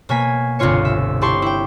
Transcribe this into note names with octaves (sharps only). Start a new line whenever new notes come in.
B2 A#3 C#5 G#5 B6
G1 C2 B2 F4 C#5 C#7
E5
E4 G4 A5 C6 C#6
E4 G5